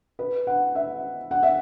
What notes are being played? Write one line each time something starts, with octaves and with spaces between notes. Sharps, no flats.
B4
F#5
E5
F#5
E5